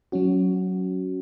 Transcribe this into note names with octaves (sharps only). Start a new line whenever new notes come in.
F#3 C#4 F#4